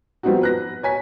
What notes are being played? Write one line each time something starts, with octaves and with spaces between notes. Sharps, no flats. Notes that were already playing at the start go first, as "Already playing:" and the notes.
F3 G3 B3 C4 D#4 F#4
B4 F#6 A#6
C#5 G#5 B6